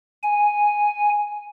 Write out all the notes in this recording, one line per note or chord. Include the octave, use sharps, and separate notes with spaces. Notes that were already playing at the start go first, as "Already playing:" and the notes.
G#5